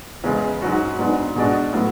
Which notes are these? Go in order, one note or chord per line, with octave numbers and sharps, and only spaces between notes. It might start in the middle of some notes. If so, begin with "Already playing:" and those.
E2 C#3 G#3
G#2 F#3 C#4 F#4
G#2 F#3 B3 D4
B2 G#3 D4 F#4
A2 F#3 B3